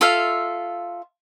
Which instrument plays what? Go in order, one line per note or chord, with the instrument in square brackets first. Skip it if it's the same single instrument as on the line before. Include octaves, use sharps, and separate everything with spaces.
[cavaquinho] F4 A4 E5 F5